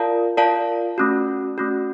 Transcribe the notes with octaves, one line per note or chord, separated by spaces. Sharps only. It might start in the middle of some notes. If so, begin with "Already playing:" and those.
Already playing: F4 A#4 D5 F5 A5
F4 A#4 D5 F5 A5
A3 C#4 F#4
A3 C#4 F#4